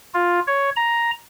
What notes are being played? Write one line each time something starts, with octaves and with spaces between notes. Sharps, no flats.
F4
C#5
A#5